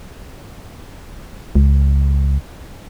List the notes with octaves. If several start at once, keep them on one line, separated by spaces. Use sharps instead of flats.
C#2